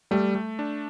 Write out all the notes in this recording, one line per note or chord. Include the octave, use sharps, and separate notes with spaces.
G3 A3
A3
D4